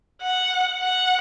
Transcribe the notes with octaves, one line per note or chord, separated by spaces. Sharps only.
F#5
F#5